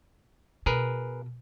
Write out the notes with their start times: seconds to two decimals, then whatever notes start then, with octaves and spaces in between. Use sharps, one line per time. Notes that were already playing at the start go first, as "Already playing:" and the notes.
0.66 B2 G#4 A#4 B4